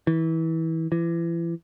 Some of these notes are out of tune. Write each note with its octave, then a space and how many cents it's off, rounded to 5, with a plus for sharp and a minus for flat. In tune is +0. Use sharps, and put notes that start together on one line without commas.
E3 -25
E3 +35